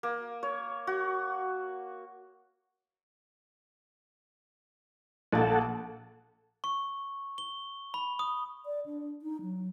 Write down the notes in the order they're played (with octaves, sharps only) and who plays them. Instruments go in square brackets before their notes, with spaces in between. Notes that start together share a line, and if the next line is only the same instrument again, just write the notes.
[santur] A#3
C#5
F#4
[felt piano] A#1 A#3 [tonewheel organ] A4 F#5 A5
[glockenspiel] C#6
G7
B5
D#6
[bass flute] D5
D4
D#4
F#3